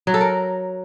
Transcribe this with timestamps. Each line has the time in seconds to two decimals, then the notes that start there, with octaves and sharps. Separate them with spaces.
0.07 F#3
0.14 A4
0.21 A#4